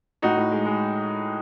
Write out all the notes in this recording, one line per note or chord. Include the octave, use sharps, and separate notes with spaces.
A2 D#4 F#4
A2
G#3
G#3